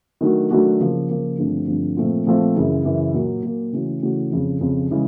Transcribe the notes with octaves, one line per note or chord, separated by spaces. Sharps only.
D#3 F#3 A3 D4 F#4
D#3 F#3 A3 D4 F#4
C#3 F3 A#3
C#3 F3 A#3
G2 D3 F3 A3 C4
G2 D3 F3 A3 C4
A#2 F3 A3 C4 F4
A#2 F3 A3 C4 F4
F#2 C#3 E3
F#2 C#3 E3
A#2 F#3 A#3
A#2 F#3 A#3
C#3 E3 A3 C#4 F#4
C#3 E3 A3 C#4 F#4
F2 C#3 F3
F2 C#3 F3
C#3 E3 G#3